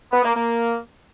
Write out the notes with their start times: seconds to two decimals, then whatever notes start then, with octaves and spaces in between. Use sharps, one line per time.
0.12 B3
0.24 A#3
0.35 A#3